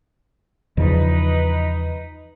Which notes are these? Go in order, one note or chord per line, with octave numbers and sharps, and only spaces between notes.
E2 C#3 F3 D#4 B4